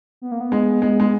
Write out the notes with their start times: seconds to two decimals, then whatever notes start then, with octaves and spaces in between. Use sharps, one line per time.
0.22 B3
0.32 A#3
0.41 B3
0.52 G#3
0.82 G#3
1.00 G#3